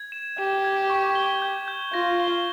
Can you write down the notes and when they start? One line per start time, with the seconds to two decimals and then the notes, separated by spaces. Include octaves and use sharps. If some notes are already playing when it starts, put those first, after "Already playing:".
Already playing: G#6
0.12 E7
0.38 G4 E7
0.64 G#6
0.90 C#6
1.15 G7
1.42 G6
1.68 G6
1.93 F4 A#6
2.20 G7